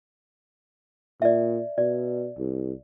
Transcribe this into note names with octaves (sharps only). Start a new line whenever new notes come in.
A#2 D5 E5
B2 D5
C2